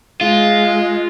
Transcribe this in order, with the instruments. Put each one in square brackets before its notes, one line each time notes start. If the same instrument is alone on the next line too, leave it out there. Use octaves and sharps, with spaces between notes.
[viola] G#3 [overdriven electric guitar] F4